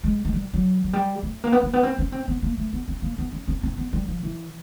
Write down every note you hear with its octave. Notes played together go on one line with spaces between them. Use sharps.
G#3
G#3
G3
F#3
F#3
G3
A3
A#3
B3
A#3
B3
C4
C#4
C4
B3
A#3
A3
B3
C4
A#3
B3
C#4
C4
C4
B3
G3
F3
E3